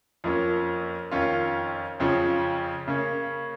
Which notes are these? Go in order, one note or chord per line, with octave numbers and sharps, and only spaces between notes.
F2 F3 A#3 C#4
F2 D#3 C#4 F4
F2 C#3 F3 C#4
C#3 A#3 C#4